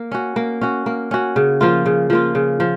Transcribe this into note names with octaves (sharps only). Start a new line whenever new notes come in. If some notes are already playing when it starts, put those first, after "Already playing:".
Already playing: A#3
C#4 F#4
A#3
C#4 F#4
A#3
C#4 F#4
C#3
F3 A#3 F4
C#3
F3 A#3 F4
C#3
F3